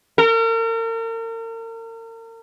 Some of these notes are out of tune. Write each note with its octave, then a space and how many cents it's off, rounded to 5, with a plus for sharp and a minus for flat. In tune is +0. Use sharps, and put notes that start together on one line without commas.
A#4 -40